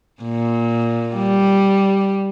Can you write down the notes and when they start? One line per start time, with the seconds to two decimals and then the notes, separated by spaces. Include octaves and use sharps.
0.23 A#2
1.15 G3